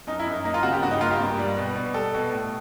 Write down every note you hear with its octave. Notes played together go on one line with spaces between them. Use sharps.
F#2 D#4
E4
F#2
D#4
A#3 D#4
F4
C#3 F#4
G4
G2 F#4
D#4
A#3 F4
G4
G2
G3
B2
B2
G3 A4
B2
A2